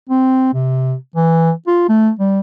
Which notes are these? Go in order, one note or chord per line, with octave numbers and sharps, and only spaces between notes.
C4
C3
E3
F4
A3
G3